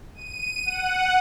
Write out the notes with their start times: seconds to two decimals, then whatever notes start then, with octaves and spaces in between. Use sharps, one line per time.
0.14 D#7
0.65 F#5